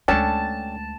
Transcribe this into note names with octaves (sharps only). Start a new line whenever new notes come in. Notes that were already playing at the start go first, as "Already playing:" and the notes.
D2 G#3 C#4 D4 A4 G5 A5